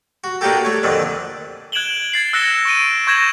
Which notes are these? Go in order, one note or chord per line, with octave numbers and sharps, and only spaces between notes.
F#4
A#3 D4 D#4 F#4 G4 A4
A3 C#5
F2 A#2 D3 D#3
F#6 G#6 D7 E7 F#7 G7
G#6 A6 C7 F#7
E6 F#6 A#6 C#7 E7 G7
C#6 D7 D#7
C#6 G6 G#6 A#6 E7 F#7